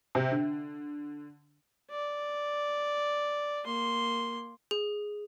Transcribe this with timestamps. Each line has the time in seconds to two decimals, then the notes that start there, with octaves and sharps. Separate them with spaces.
0.15 C3
0.31 D3
1.90 D5
3.65 A#3 C6
4.71 G#4